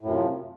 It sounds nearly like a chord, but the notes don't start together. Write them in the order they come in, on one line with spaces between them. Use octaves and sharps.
A2 F#2 C3 F3